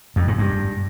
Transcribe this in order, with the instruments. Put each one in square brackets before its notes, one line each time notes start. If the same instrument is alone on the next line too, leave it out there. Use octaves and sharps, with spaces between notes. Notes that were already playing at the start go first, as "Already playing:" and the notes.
[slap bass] F2
G#2
G2